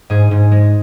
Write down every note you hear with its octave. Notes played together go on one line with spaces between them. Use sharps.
G#2 G#4
G#2
G#3